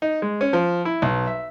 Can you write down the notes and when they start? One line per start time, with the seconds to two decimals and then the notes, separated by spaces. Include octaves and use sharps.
0.02 D#4
0.22 G#3
0.41 C#4
0.53 F3
0.85 E4
1.02 B1
1.27 E5